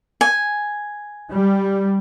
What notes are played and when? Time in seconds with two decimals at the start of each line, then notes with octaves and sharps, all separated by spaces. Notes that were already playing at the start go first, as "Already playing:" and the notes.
0.21 G#5
1.31 G3